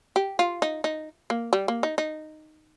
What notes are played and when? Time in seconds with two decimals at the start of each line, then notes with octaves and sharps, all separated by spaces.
0.16 G4
0.39 F4
0.62 D#4
0.84 D#4
1.30 A#3
1.53 G3
1.68 A#3
1.83 D#4
1.98 D#4